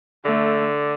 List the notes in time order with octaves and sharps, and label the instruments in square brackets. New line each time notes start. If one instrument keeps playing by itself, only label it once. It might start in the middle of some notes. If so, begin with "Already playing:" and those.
[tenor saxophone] D3 [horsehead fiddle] A3